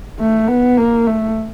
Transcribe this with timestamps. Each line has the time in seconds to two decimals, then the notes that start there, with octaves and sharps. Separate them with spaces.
0.20 A3
0.48 B3
0.77 A#3
1.06 A3